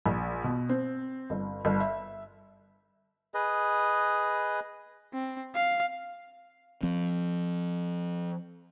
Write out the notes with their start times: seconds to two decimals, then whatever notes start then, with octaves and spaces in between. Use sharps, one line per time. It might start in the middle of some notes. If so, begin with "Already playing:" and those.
0.06 A#1
0.44 B2
0.69 C4
1.30 G1
1.65 G1
1.80 E5
3.34 G#4 B4 D#5
5.13 C4
5.55 F5
6.83 F3 C4